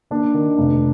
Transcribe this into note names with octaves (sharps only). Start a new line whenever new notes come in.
D#2 D4
D#3
F1